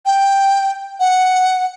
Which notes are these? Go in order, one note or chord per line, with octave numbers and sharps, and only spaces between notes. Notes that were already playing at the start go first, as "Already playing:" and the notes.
G5
F#5